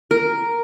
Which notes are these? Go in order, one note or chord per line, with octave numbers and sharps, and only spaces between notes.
A#4